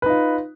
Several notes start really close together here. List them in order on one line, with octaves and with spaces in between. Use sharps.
B4 D#4 F4